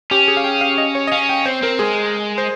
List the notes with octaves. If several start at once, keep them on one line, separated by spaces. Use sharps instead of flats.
C#4 G4
G#4
F5
G5
F5
D#5
C#5
D#5
C#4 F5
G5
C4 C5
C4 A#4
G#3 G#4
C5